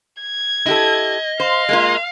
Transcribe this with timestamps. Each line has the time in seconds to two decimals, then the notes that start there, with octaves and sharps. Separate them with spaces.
0.21 G#6
0.66 E4 G4 A4 D#5
1.40 C5 F5
1.69 G#3 A#3 F4